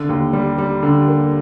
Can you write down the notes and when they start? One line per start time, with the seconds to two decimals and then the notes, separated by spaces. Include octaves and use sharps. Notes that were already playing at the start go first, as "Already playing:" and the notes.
Already playing: D3
0.09 D#2
0.33 G3
0.58 G3
0.83 D3
1.08 A#3